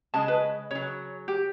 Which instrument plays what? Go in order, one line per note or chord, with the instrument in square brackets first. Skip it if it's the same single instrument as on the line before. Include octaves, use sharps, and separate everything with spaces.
[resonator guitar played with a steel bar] C#3 G#3 D#5 [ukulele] A5
[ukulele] B4
[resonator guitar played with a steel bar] C#3 F#3 [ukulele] C#5
[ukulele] G4